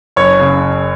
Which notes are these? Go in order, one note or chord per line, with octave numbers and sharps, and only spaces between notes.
F#1 C#5
C#3